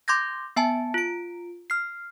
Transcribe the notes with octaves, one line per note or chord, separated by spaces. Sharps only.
C6 D6 G6 G#6 A#6
B3 E5 G#5 A5
F4 D7
F6 C7